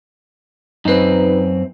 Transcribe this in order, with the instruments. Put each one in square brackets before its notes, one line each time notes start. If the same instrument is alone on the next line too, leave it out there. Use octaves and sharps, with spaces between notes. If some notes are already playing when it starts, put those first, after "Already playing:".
[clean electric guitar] F#2 C4 [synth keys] D#4 B4